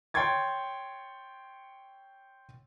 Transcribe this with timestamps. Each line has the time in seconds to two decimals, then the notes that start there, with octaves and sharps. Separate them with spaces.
0.14 C#5 G5 C6 C#6 G#6 A6